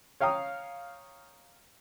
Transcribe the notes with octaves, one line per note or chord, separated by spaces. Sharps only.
C#5 F5 G5 A#5 D#6